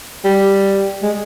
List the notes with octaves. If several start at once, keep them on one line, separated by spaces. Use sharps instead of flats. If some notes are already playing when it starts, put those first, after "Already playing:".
G3
G#3